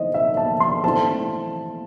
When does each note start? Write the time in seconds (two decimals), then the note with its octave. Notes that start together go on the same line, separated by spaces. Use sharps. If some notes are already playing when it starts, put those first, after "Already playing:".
Already playing: E3 D#4 C5 D#5
0.14 E5
0.37 A5
0.60 C6
0.84 E3 A3 C4 A5